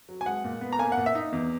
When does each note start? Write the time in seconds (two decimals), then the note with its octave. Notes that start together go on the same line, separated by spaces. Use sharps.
0.09 F#3
0.21 G#5
0.26 G#3 F#5
0.44 A#2
0.61 B3
0.73 A#5
0.79 A#3 G#5
0.92 F#5
0.97 A#2
1.06 E5
1.15 D#4
1.32 E2